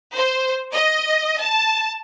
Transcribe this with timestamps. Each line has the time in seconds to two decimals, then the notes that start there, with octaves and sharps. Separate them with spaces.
0.14 C5
0.73 D#5
1.40 A5